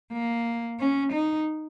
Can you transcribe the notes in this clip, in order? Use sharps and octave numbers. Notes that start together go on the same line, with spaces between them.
A#3
C#4
D#4